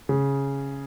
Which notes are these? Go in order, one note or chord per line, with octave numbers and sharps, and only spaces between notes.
C#3